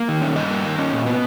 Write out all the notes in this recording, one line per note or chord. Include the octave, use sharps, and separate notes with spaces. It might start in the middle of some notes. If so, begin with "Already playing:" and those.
Already playing: A#3
D#3
C#4
G2 D#5
A#3
D#3
C#4
A#2
B3